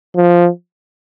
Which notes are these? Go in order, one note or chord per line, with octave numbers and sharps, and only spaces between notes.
F3